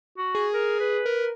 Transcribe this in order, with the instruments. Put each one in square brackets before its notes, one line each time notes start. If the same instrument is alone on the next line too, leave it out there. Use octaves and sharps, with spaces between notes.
[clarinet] F#4
[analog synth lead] G#4
[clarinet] A#4
B4
[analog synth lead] A#4